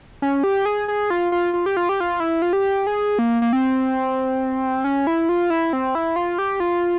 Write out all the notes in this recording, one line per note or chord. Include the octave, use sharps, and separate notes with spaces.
C#4
G4
G#4
G#4
F4
F4
F4
G4
F4
G4
F4
E4
F4
G4
G#4
A#3
A#3
C4
C#4
E4
F4
E4
C4
E4
F4
G4
F4